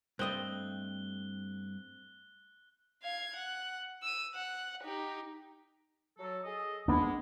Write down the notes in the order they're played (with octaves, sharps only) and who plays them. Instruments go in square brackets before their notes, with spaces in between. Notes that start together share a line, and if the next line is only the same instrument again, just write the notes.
[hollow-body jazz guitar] G2 A3 [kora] C4 D#5 [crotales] F#6 G7
[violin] F5 G#6
F#5
E6 D#7
F#5
D#4 G4
[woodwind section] F#3 A4
G#4 A4 D#5
[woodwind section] G#3 [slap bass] B3 D4